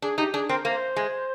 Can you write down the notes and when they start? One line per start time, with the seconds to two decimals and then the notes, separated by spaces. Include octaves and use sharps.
0.02 D4 G#4
0.18 D#4 G4
0.34 D4 G#4
0.49 C4 A#4
0.65 A#3 C5
0.96 G#3